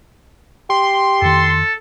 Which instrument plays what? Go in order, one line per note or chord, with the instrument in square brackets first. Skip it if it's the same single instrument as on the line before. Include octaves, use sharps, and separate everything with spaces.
[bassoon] G4 [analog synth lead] C6
[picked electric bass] F2 D#3 [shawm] A4